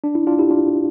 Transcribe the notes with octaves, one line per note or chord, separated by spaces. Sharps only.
D4
E4
D4 F4
E4 G4
D4 F4